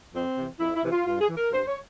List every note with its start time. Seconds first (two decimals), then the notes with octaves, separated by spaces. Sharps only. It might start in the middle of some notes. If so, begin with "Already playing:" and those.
0.13 F2 C4
0.36 C3 E3
0.59 F2 E4
0.75 E4
0.84 C3 E3
0.91 F4
1.06 G2 F4
1.21 G#4
1.29 E3
1.36 A#4
1.52 G2 C5
1.67 C#5